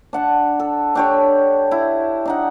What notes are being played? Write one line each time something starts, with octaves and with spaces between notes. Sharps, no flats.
D4 F#5 A5
A4
D4 G4 C#5
E4
D4 D#4 F#5